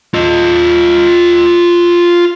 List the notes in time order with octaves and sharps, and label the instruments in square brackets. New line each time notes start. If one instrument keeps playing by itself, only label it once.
[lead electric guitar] F4 D#5